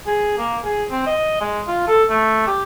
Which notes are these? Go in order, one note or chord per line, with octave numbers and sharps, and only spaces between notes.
G#4
A#3
G#4
C4
D#5
G#3
F4
A4
A3
G4